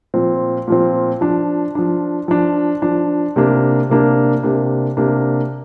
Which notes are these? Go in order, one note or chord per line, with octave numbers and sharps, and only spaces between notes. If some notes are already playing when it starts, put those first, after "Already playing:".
A#2 F3 C4
A#2 F3 C4
F3 D4
F3 D4
F3 D4
F3 D4
C3 A#3 D4
C3 A#3 D4
C3 A#3 D4
C3 A#3 D4